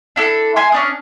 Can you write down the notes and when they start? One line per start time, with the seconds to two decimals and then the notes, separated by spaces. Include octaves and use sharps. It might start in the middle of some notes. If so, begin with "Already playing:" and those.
0.16 D4 E4 A4
0.56 E5 G#5 C6
0.72 C#4 D4 D#6